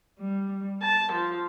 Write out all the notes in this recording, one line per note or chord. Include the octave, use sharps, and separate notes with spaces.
G3
A5
F3